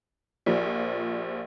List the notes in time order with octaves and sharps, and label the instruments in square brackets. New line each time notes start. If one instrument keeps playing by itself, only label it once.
[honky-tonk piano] A#1 F3 [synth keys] G4 A#4 D5